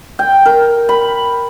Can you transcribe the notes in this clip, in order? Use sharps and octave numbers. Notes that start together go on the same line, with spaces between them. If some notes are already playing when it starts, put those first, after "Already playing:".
G5
A#4
B5